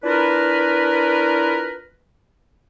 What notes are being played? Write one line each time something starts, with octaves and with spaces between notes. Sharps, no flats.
D4 E4 F4 A#4 B4